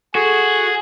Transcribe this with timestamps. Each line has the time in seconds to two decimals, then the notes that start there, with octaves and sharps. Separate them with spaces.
0.15 F#4 G#4 A4 C#6 C#7